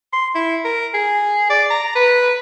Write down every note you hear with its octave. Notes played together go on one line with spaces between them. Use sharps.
C6
E4
A#4
G#4
D5
A#5
B4